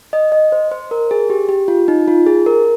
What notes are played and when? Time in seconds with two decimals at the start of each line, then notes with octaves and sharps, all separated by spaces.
0.13 D#5
0.32 D#5
0.52 C5
0.71 C5
0.91 A#4
1.11 G#4
1.30 G4
1.49 G4
1.68 F4
1.88 D#4
2.08 F4
2.27 G#4
2.46 A#4